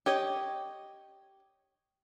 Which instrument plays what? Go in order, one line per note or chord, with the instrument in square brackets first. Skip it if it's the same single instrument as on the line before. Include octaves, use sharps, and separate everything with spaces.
[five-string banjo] G4 C#5 D#5